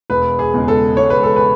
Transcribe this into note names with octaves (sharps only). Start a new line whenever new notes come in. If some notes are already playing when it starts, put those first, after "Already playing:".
E1 B4
G#4
E2 C#3 G#3
A4
E1 C#5
B4
A4
B4